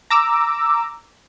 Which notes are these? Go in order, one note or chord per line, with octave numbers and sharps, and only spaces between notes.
A#5 D6 E6